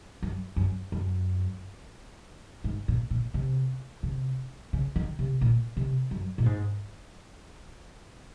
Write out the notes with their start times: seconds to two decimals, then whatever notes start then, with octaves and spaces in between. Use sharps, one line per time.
0.22 F#2
0.56 F#2
0.92 F#2
2.64 G#2
2.88 A#2
3.11 A#2
3.34 C3
4.03 C3
4.73 C#3
4.96 D#3
5.19 C3
5.41 A#2
5.77 C3
6.11 F#2
6.38 A#2
6.46 G#2